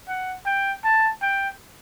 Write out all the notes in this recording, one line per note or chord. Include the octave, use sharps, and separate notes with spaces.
F#5
G5
A5
G5